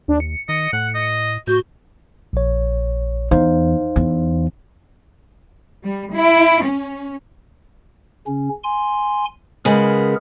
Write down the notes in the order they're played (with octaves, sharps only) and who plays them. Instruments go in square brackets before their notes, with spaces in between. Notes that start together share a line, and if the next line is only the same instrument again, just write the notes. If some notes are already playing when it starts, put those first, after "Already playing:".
[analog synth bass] D#2 [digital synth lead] D4
[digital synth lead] C#7
[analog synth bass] D#3 [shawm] D#5
[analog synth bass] A2 [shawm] F#5
[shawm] D#5
[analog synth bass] A2 [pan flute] F#4 [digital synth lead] G6
[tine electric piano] A#1 C#5
[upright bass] E2 [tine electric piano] D#4 C5 F5
[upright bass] E2
[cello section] G3
E4
C#4
[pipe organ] C#3 C#4
G#5 C6
[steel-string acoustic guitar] C#3 G#3 B3 [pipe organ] G#4 A#4